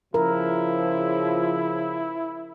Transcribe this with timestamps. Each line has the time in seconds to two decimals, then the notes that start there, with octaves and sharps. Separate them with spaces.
0.14 C#3 F3 E4 A#4